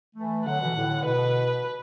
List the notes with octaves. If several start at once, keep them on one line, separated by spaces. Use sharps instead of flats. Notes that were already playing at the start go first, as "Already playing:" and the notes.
E3 A3
D3 F#3 F#5
B2 E3
A2 D3
B2 B4